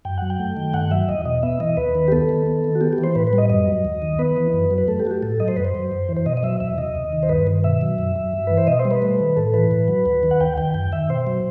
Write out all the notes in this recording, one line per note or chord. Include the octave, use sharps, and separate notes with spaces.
F#2 G5
F#3 F#5
G5
A3
D#3
G2 F#5
F#3 E5
E2 D#5
B2 D#5
B3 E5
E3 D#5
D#2 B4
D#3
G4
B3 A4
D#3
B3
D#3
F#4
B3 G4
G4
E3
C5
A2 B4
B4
G3
D#5
F#2 D#5
F#3
D#2
D#3
B3 B4
E3
F#2
F#3
B4
A3 A4
G4
A3 F#4
G4
A2 A4
F#3 D#5
C5
F#2 B4
C5
F#3
F#2
E3
C5
B2 D#5
D#5
F#3 E5
E2 E5
C3 D#5
D#2
D#3
C5
G2 B4
D#3
B2 E5
F#3
F#2
F#3
G2
E3 B4
C5
B2 D#5
C5
G3
B4
A3
D#3
A2 A4
E3 B4
A2
F#3
D#2
D#3
F#5
D#2 G5
D#3 G5
F#2 G5
D#3 E5
B2 C5
F#3